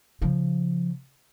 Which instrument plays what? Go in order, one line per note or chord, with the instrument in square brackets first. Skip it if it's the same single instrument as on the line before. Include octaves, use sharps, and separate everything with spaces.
[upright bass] C#3 F3